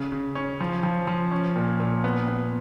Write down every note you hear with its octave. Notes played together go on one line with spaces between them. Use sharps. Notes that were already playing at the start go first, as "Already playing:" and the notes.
Already playing: C#3
C#3
C#4
F3
F3
F3
C#4
A#2
A#2
B3
B3